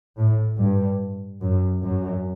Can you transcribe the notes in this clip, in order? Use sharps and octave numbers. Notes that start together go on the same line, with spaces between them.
A2
G2
F#2
F#2